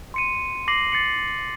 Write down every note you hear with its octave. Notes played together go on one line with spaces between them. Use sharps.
C6 C#7 D#7
D6 A#6 C7 F#7
A6 C7 C#7 F#7